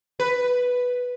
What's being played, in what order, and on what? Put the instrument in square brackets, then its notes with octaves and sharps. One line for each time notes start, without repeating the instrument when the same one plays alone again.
[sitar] B4